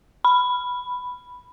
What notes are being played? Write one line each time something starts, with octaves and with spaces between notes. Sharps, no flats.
B5